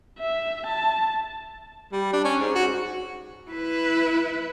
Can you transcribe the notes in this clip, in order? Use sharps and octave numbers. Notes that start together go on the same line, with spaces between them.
E5
A5
G3
D4
C#4
G#2
F#4
E4 B4